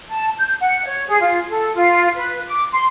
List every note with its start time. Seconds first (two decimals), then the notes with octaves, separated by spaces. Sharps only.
0.09 A5
0.37 G6
0.60 F#5
0.85 C#5
1.07 G#4
1.21 F4
1.49 A4
1.74 F4
2.15 B4
2.48 D6
2.71 C6